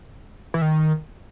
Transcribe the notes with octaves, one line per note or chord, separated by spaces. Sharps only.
E3
D#3